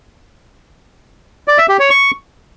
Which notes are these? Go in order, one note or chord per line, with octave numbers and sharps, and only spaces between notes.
D5
E5
G4
C#5
C#6